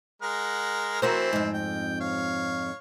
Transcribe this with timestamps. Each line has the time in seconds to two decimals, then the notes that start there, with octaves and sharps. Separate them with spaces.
0.22 G#3 A#4 F#5
1.02 E3 C4 F#4 A#4 C5
1.33 F2 G#2
1.54 G5
2.00 C#5 F5